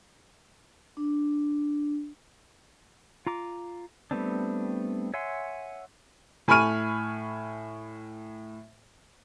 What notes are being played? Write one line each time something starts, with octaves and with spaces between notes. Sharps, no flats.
D4
F4 A#5 D6
G3 A3 B3 C4 D4
C#5 E5 F#5 G#5 C6
A2 G#5 B5 C#6 F6 D#7